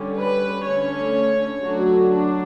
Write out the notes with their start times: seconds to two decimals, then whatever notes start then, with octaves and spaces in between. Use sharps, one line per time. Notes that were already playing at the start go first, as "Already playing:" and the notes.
Already playing: D3 G3 C#4
0.18 B4
0.66 D3 A3 C#4 C#5
1.64 D3 F#3 A3 D4 F#4
2.13 D4